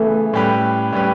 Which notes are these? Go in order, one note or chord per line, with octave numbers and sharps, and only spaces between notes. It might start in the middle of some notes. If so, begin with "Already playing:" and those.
Already playing: C#3 E3 A3 B3
A2 G3 C#4 G4 B4
A2 G3 C#4 G4 B4